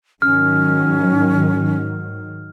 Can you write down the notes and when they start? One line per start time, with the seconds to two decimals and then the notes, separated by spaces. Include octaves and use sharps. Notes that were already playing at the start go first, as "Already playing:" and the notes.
0.22 G#2 D#3 F#3 C#4 F6